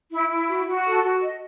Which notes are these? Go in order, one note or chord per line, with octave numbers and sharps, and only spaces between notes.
E4
E4
F#4
F#4
A4
F#4
D#5